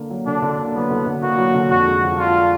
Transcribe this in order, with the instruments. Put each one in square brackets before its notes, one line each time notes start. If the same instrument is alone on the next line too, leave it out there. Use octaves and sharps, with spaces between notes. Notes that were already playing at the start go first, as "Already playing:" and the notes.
Already playing: [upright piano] D3 A#3
F#3
[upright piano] D3 [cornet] D4
[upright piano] D3
A#3
[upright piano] F#3 [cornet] B3
[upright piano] D3
D3
[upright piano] A#3 [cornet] F#4
[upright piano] F#3
D3
[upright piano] F2 [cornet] F#4
[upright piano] G#3
F3
[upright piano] D4 [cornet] F4